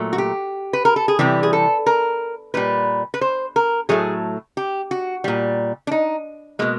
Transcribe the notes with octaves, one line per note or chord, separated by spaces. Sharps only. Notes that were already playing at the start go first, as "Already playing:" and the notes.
Already playing: A#2 F#3 A3
F#4
G4
B4
A#4
A4
G#4
C3 E3 G3 G4
G#4
A4
A#4
A#2 G3 B4
B4
C5
A#4
A2 F#3 A3 G#4
G4
F#4
A#2 G3
D4
D#4
B2 G#3 A#3